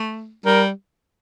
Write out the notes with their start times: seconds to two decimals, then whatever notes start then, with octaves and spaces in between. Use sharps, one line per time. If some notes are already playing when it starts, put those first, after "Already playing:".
Already playing: A3
0.46 G3 A#4